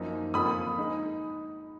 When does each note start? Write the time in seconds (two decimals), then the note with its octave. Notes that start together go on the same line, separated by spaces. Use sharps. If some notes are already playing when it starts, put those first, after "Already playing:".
Already playing: F#2 F3 A#3 D#4
0.34 F2 C#3 F3 A#3 F4 B5 D#6
0.78 G#3 D#4